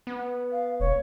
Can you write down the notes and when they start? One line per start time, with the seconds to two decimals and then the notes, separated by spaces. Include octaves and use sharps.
0.07 B3
0.52 F5
0.80 E1 C#5